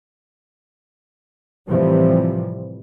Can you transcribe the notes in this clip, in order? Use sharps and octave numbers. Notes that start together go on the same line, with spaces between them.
A2 C3 E3 F3 G3